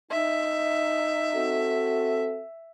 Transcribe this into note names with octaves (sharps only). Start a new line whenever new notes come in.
D#4 E5
C4 F#4 A4